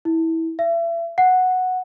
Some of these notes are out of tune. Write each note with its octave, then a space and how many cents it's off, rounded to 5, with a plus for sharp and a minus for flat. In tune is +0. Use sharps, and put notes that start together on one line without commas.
E4 -20
E5 +35
F#5 -5